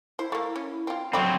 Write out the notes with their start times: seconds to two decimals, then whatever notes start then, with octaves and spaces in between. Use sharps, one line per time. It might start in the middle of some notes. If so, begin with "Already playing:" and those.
0.19 E4 C5
0.32 A3 A#3
0.56 C#4
0.87 C4 F4
1.13 F#3 A3 C4 D5 G5 B5